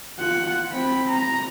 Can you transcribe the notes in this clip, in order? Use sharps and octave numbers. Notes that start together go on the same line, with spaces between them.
F4 F#5
C4 B5
A#5